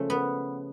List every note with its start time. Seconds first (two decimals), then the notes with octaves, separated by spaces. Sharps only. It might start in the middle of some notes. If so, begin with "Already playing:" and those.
Already playing: C#3 F3 A3
0.10 B3